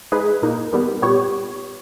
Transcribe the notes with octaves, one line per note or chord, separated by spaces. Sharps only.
G#3 D#4 G#4 B4
A#2 A#3 D#4
D#3 G3 B3
A#2 G3 B3 G4 C#5